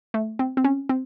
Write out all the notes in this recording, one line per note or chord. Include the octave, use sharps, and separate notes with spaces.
A3
C4
C4
C#4
C4